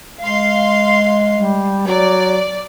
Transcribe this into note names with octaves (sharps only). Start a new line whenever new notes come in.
G#3 F5 C6
G3
F#3 D5